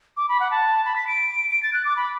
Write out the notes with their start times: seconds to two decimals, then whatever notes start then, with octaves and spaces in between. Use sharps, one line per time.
0.17 D6
0.29 B5
0.40 F#5
0.51 A5
0.85 B5
0.96 B6
1.07 D7
1.51 D7
1.63 A6
1.73 F#6
1.85 D6
1.96 B5